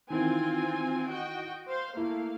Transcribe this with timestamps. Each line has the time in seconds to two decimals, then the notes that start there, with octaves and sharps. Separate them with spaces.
0.10 D#3 E3 C4 F4 G#5
1.09 F#4 D#5 G5
1.68 C5 F5
1.97 A3 A#3 E4 F5